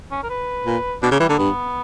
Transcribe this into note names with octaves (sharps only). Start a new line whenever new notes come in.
C#4
A#4
B4
A#2
B2 D4
C#3 A#3
E3 G3
D3 A#3
G2 B3